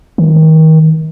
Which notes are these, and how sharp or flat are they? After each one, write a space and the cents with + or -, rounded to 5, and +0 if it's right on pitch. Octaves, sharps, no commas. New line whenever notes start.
D#3 +30